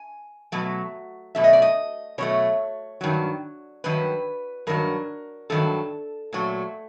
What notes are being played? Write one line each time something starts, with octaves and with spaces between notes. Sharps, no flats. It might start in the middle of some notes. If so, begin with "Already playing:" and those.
Already playing: G#5
B2 F#3 A3
B2 F#3 A3 E5
D#5
D5
D#5
B2 F#3 A3 C#5
G2 D#3 F#3
G2 D#3 F#3 B4
G2 D#3 F#3 A#4
G2 D#3 F#3 A4
A#2 F#3 A3